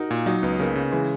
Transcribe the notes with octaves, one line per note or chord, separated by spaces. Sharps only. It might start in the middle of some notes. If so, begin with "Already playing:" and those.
Already playing: D#4 F#4 A#4
A#2
F#3 D#4
C#2 B3
C#3 A#3
C#3
E3 G#3